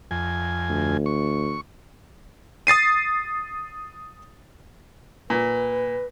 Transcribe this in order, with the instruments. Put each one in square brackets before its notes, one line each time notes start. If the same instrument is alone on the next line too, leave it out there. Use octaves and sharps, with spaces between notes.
[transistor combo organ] F2 G#5
[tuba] D2
[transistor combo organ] C#6
[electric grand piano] D#6 A6 C7 D#7
[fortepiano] A#2 [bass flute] B4